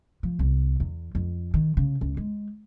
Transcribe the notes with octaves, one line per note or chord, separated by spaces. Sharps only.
F3
C2
E2
F2
D#3
C#3
C#2
G#3